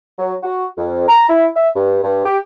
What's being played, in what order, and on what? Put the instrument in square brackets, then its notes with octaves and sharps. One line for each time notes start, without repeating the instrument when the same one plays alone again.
[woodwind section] F#3
F#4
F2
A#5
E4
E5
G2
G2
G4